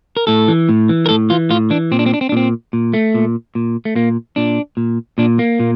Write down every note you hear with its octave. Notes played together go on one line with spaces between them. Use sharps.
A#4
A2 A4
E3
A2
E3
A#4
A2 A4
E3 F4
A2 F4
E3 D4
A#2 C4
D4
C4
D4
C4
D4
A#2 C4
A#2
A3
A#2
A#2
A3
A#2 A#3
A#2 D4
A#2
A#2 D4
A#3
A#2